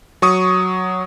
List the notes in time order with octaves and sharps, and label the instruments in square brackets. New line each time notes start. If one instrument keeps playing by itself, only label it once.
[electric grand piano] F#3 C#6 D#6